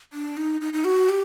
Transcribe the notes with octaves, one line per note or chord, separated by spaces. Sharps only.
D4
D#4
D#4
D#4
F#4
G4